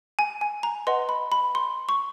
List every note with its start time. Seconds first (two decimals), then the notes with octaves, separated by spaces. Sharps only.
0.19 G#5
0.41 G#5
0.63 A#5
0.87 B4 D#5 F#5 C6
1.09 B5
1.32 B5
1.55 C6
1.89 C#6